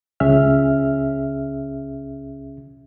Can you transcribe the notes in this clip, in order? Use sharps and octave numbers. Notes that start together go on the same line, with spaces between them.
C#2 C#4 G#4 E5 F6